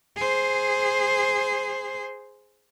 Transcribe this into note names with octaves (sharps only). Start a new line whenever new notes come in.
G#4 C5